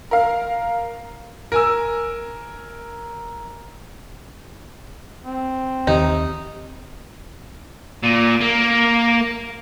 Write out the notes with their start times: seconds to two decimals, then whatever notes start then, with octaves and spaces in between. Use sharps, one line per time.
0.11 A#4 F5
1.52 A#4 G#5 E6
5.24 C4
5.87 D#2 C3 D#3 D#4
8.04 A#2
8.41 A#3